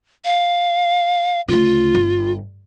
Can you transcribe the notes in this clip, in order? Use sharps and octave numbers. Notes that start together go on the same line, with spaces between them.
F5
D2 C#3 F4
G1